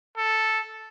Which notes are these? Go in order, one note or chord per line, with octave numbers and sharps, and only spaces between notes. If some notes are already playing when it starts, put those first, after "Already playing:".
A4